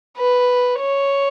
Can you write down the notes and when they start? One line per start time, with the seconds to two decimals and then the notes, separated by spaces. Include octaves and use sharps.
0.17 B4
0.80 C#5